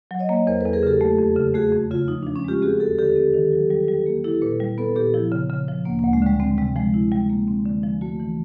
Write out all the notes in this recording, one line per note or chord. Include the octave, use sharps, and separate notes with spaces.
F#3
C#5 D#5
A#3
E2 A#4 C5
E2 A4 B4
G#4 A#4
C#3 G4 A4
A3
F2
C#3
A3 F#4 G#4
F2
C#3 F4
F3 D#4
F3 D4
C#4
G#3 F4 G4
C4 F#4 G#4
D#2 G4 A4
D3 G4 A4
C4
D#3
F#3
G3
G3
A#3
E4 G4 A4
A#2 A4 B4
G3
B3 A4 B4
A#2 G4 A4
F3 E4
C#3
C#3
F3
D2 A#3
D2 A#3
G#3
D3 G3
G#3 C4
C3 G3
F3 G#3
E4
G3
A#3
C4
D3
F3
A3 F#4
E3